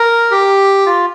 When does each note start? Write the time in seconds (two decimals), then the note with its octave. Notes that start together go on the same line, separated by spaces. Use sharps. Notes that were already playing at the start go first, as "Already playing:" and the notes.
Already playing: A#4
0.31 G4
0.86 F4